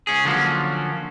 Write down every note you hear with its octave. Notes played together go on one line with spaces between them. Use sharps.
C#2 C#4 G#4
D3 F3 F#3 G#3 A#3 C#4